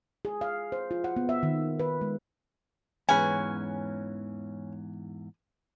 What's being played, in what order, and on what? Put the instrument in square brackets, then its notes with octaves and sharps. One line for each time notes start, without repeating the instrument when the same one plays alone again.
[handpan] G#4
F5
C5
F4
F#5
B3
E5
D#3
B4
G#3
[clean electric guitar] E2 G#2 E3 [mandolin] C#4 [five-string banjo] G#4 B4 [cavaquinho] G#5